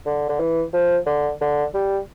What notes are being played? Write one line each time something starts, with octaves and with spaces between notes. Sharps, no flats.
D3
D3
E3
F3
D3
D3
G3